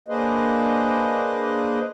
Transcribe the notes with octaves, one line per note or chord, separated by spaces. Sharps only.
A#3 D4 G#4 B4 C5 D#5